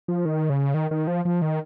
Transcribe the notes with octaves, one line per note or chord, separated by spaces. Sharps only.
F3
D#3
C#3
D#3
D#3
F3
F3
D#3